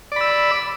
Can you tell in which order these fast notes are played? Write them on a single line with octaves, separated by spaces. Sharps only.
D5 B5 E6